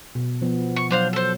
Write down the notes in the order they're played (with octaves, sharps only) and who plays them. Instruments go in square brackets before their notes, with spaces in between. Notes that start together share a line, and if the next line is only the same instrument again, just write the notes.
[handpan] B2
F3 B3
[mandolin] C#6
[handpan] F#3 [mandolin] D4 C5 F5
[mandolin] A4 C5